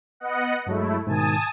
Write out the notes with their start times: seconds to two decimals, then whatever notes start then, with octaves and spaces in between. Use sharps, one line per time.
0.20 B3 D#5 F#5
0.66 G2 F#3 G#3 A3 E4
1.07 G#2 B2 D#3 G#5 A5 D#6